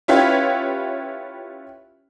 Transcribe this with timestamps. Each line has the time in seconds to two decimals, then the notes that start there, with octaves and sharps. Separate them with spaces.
0.08 C#4 E4 F4 G4 B4 C#5